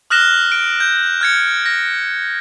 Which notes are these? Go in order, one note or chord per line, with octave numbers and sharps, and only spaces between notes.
D#6 F6 F#6 A#6 E7 G7
D7
G6
F6 G#6 C#7
A#6